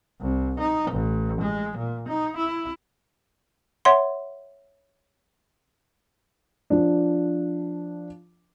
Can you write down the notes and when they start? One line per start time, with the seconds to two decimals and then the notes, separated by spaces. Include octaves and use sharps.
0.21 C2
0.60 D#4
0.92 A1
1.41 G#3
1.78 A#2
2.08 D#4
2.37 E4
3.85 C#5 E5 F#5 C6
6.70 F3 D4